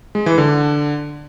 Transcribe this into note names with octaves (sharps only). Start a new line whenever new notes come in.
G#3
E3
D3